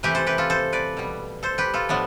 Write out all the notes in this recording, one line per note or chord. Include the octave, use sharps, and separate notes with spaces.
C3 E3 A3 G4 B4
A4 C5
G4 B4
F4 A4
A4 C5
B4 D5
B2 G3
A4 C5
G4 B4
F4 A4
A2 F3 B3 D4